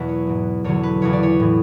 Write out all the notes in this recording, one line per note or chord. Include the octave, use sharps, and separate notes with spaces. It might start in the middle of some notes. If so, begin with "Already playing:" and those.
Already playing: E2 B2 F#3 B4 E5 F#5
C#5
G#2 E3
E2 D3 F#3 C#5
B4
E2 C#3 E3 C#5
D5
C#5
A2 E3